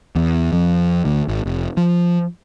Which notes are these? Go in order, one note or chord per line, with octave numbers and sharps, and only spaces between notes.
E2
F2
D2
G#1
F1
F3